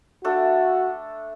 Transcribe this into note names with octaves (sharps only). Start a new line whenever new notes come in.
A3 D4 F#4 A4